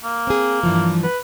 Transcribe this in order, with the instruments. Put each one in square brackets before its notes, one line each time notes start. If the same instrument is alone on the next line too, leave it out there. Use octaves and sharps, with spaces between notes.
[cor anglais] A#3
[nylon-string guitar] C4 G#4
G2 E3 F3
[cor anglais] B4